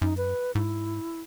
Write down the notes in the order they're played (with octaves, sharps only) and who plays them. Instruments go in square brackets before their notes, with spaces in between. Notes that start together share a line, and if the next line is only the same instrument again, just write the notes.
[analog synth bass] F#2 [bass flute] D#4
[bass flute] B4
[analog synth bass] G#2 [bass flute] E4